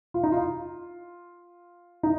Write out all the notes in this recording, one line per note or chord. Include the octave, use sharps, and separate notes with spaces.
F4
D#4
F4
D#4